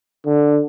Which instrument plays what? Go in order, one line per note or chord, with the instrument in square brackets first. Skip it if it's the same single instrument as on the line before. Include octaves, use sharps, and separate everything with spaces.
[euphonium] D3